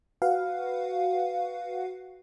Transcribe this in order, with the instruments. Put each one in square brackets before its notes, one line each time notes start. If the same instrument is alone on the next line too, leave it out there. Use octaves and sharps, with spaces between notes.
[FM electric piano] F#4 B4 F5 F#5